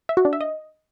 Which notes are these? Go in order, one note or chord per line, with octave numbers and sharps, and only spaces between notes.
E5
F#4
D4
E5
D#5